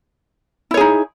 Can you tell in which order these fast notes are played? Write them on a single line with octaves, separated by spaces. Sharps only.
E4 C#5 G#4 D#4